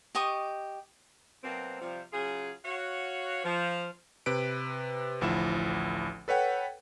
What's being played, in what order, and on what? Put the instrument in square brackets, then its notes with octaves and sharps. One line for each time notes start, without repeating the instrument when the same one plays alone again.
[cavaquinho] G4 D#5 C#6 D#6
[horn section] B2 F#3 A#3 C4
C3 F3 G3
C#3 F#3 F4 G#4
F#4 C#5 F5
F3
[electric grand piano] C3 B4 D7
A1 D2 F3 E4 E7
A4 B4 C#5 F#5 G5